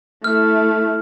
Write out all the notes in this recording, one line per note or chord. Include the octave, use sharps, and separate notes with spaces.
A3 E4 F6